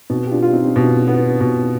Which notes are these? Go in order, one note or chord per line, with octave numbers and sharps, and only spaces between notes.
B2 C4 D#4
G4
D4 F4
F4
C4 D#4
B2
B3
B2